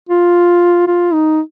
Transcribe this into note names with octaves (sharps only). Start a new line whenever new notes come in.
F4
F4
D#4